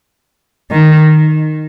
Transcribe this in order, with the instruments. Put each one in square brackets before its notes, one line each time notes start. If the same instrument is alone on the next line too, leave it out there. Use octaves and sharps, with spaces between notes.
[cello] D#3